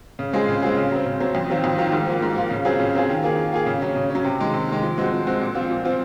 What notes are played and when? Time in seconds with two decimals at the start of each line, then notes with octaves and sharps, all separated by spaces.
0.19 C#3
0.33 G#3 C4 F4 G#4
0.48 C#3
0.63 G#3 C4 F4 G#4
0.77 C#3
0.92 F#3 C4
1.06 C#3
1.20 F#3 C4
1.35 F2
1.49 D#3 F#3 C4 F4
1.64 F2
1.78 D#3 F#3 C4 F4
1.92 G#2
2.07 F3 A#3 F4
2.22 G#2
2.36 F3 A#3 F4
2.50 C#3
2.65 F#3 C4 F4 G#4
2.80 C#3
2.95 F#3 C4 F4 G#4
3.09 D#3
3.23 A#3 F4 G#4
3.37 D#3
3.53 A#3 F4 G#4
3.66 C#3
3.82 F#3 C#4
3.96 C#3
4.10 C#4
4.15 F#3
4.24 C3
4.39 D#3 G#3
4.54 C3
4.68 D#3 G#3
4.82 F3
4.98 G#3 C4 F#4
5.12 F3
5.27 G#3 C4 F#4
5.41 A#2
5.55 F3 C4 F4
5.70 A#2
5.85 F3 C4 F4